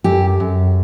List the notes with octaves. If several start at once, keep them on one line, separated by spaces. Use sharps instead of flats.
F#2 G4
F#2